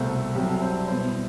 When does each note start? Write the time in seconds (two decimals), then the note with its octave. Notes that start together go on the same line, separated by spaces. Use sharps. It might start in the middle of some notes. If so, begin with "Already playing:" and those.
Already playing: C2 B2 A3 C5
0.08 A4
0.35 C2 C3 F#3 G4
0.48 A4
0.62 C5
0.74 D5
0.88 B2 G3 B3 E4 C5